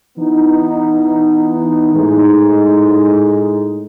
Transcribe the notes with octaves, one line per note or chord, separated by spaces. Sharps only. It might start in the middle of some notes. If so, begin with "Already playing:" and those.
E3 B3 D#4
A2 G#3 D#4